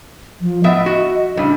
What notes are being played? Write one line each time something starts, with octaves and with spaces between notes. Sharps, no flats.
F3
A2 B3 D#5 E5
F#4
A2 C#3 G3 D4